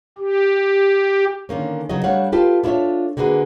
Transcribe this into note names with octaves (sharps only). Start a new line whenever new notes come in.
G4
D3 D#3 A#3 C#4
C#3 F#3 B3 F#4 D#5
G3 A3 D4 C#5 F5 F#5
F4 G4 A4 B4
D4 E4 F4 A4 C#5 E5
D3 A#3 F#4 G#4 B4